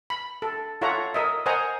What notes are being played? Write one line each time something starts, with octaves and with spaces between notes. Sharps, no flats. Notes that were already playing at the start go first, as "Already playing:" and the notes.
B5
A4
F4 A4 C#5 E5 F#5 A#5
A#4 D#5 E5
A#4 C5 D#5 F#5 G#5 A#5